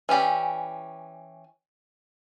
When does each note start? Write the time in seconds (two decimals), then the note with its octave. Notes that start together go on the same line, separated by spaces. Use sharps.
0.09 E3 C#4 G4 D5